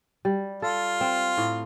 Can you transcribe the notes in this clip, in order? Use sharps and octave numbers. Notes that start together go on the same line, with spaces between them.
G3
F4 A4
C4
A2